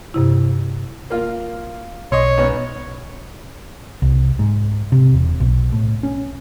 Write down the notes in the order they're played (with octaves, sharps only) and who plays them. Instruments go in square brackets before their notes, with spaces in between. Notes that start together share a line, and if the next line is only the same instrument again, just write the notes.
[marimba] G2 C3 E4
[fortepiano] A#3 F4
[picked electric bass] B1 [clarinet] C#5 [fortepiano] D#5 C6
[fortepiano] G#2 B3 C#4
[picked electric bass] C2
G#2
C3
E1
B1
A2
C#4